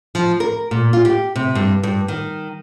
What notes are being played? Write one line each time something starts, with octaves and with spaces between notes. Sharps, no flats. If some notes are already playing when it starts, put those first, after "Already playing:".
F3
A#4
A#2
F4
G4
C3
G2
G2
D#3